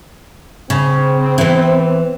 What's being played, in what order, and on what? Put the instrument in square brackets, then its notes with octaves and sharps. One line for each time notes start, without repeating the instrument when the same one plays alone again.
[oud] C#3 [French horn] C4
[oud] E3 B3